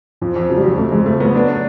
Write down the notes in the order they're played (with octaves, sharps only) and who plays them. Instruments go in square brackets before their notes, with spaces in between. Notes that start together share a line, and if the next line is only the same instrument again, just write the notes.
[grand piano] F2 [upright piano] F3
[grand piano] F2
[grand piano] C#3 [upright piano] F#3
[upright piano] G3
[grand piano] F2 [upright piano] F#3
[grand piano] F2 [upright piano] A3
[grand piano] F2 [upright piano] G#3
[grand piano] C#3 [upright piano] A3
[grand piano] F#3 [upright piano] B3
[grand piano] D4
D4